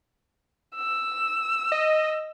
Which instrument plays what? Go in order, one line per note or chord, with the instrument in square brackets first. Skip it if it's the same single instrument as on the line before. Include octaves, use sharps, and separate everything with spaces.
[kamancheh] E6
[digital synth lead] D#5